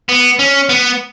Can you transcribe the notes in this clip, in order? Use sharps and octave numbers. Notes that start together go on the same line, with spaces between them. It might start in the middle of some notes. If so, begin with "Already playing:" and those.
B3
C#4
B3